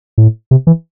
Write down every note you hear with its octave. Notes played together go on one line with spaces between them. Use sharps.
A2
C3
E3